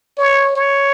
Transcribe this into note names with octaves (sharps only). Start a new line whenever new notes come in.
C#5
C#5